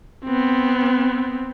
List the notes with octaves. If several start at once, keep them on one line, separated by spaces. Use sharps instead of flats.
B3 C4